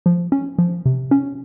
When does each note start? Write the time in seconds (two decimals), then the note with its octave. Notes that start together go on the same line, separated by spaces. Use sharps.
0.06 F3
0.32 C#4
0.59 F3
0.86 C3
1.11 C#4